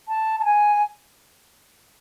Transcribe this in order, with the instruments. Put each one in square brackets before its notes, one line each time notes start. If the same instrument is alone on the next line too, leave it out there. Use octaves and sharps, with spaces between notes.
[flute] A5
A5
G#5